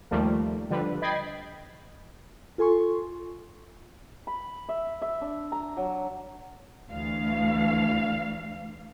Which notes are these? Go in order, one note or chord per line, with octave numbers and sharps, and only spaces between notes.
D#2 F3 G3 A3 A#3
D3 F3 G3 B4
D#5 G5 B5 G#6 A6 C7
F4 A4 G#5 C6 C#6
B5
E5
E5
D4
A#5
F#3
D2 E3 F5